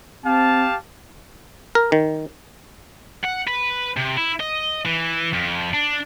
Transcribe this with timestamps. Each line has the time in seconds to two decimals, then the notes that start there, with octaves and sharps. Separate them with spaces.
0.24 C4 G4 F5 A5
1.75 A#4
1.92 D#3
3.24 F#5
3.47 B4
3.97 C3
4.18 E4
4.40 D#5
4.86 E3
5.33 F2
5.73 D4